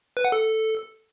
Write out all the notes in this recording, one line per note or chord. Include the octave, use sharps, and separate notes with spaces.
B4
F#5
A4